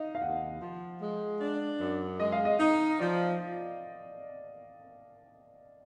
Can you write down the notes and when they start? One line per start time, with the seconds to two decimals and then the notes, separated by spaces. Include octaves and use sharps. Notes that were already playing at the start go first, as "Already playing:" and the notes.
Already playing: D#4 D#5 F5
0.15 F5
0.21 D#2 F#5
0.61 F3
1.01 G#3
1.41 D4
1.80 F#2
2.20 G#3 D#5
2.32 F5
2.45 D#5
2.59 D#4 D#5
2.99 F3 D5